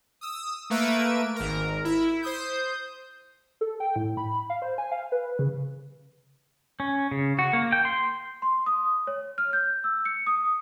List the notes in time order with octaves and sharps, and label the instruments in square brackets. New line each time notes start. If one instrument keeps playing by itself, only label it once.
[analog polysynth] D#6 E6
A3 A#3 B4 E5 E6 D7
G#1 A#4
E4
C5 D#6 G6
[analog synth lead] A4
G5
A2
B5
F5
C5
G#5
F5
B4
C#3
[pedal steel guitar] C#4
C#3
F#4
A#3
G5
C6
[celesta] C6
D#6
C#5
F6
G6
E6
C#7
D#6